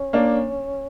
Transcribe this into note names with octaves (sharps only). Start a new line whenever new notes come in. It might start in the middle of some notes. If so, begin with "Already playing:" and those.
Already playing: C#4
A#3 D4